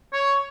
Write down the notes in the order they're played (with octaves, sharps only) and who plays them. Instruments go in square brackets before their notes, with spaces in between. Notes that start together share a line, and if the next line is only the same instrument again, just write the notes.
[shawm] C#5